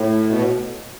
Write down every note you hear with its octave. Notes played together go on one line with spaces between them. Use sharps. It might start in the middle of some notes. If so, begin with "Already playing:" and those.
Already playing: A2
B2
A2